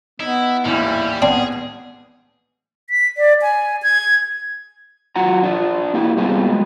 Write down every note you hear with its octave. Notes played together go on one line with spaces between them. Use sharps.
B3 D#4 E4
A1 D#2 G#2 G3 E4
B3 C4 D4 G#4
B6
D5
G#5
G#6
F#3 F4 F#5 A#5
D4 F4
A#3 E4 G4
G3 B3 C4 F4 G4 G#4
F#3 G#3